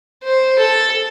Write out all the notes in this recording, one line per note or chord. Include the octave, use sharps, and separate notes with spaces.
C5
A4